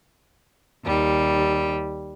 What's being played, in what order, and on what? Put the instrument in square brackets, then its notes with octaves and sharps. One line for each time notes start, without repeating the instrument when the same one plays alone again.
[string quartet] D#2 G3